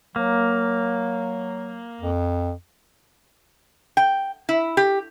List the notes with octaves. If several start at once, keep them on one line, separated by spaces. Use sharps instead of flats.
F#3 A#3
F2
G5
E4
G4